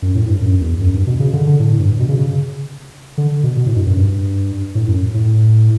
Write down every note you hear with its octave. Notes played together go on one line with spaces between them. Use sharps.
F#2
A2
G2
F#2
E2
F#2
G2
B2
C#3
D3
D3
A2
G2
B2
C#3
C#3
D3
B2
B2
A2
G2
F#2
G2
A2
F#2
A2